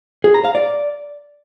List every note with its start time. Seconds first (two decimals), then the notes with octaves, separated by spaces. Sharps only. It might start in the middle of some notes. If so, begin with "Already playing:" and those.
0.24 G#4
0.34 A#5
0.45 F5
0.55 D5